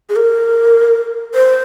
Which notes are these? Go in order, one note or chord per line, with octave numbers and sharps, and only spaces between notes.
G#4
A#4
C5